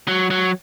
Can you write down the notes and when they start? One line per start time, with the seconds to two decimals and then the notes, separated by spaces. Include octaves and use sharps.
0.08 F#3
0.30 F#3